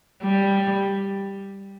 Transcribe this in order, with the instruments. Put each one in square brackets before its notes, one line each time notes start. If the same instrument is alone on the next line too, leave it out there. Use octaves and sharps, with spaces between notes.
[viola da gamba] G3